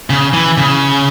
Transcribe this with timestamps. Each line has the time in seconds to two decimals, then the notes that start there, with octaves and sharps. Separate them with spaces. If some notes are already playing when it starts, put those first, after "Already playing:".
0.10 C#3
0.34 E3
0.58 C#3